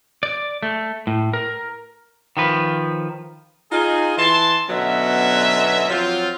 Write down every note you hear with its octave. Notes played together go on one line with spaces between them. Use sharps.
D5
A3
A2
A#4
D#3 F3 B4
D#4 F4 G#4
E3 A5 C6
B2 D3 F#3 B3 C#4 E5
F3 F#3 C4 F4